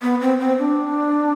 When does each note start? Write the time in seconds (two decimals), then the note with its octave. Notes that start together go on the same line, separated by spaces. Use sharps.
0.02 B3
0.21 C4
0.40 C4
0.59 D4